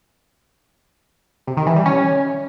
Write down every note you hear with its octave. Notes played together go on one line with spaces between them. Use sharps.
C3
D#3
E3
G3
C#4